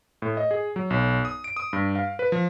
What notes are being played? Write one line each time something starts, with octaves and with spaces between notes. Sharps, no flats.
A2
D#5
G#4
F#3
B1
D#6
D7
D#6
G2
F5
B4
F3